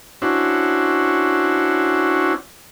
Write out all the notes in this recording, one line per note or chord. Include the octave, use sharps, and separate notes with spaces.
C#4 D4 E4 F#4 C5